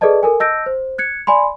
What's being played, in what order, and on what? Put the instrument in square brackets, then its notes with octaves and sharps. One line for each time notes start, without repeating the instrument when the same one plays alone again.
[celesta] G#4 A4 B4 D5 D#5 A5
A4 A#4 G#5
D#5 A5 E6 G6 A#6 D7
C5
F#6 G#6 C#7
D5 G#5 B5 C6